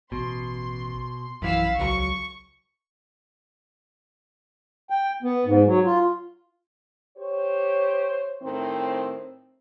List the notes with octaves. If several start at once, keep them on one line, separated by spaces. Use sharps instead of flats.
A1 B2 C6
A#1 F#2 E3 F5 B5 E6
C#2 F#3 C#6
G5
B3
G#2
F#3
F4
G4 C5 C#5
A2 D#3 C4